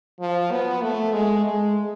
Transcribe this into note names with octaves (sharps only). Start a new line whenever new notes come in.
F3
B3
A3
G#3
G#3